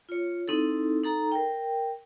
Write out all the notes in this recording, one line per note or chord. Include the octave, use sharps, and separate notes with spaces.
F4 C#5
C4 D#4 E4 A4
D#4 A4 A#5
A#4 G5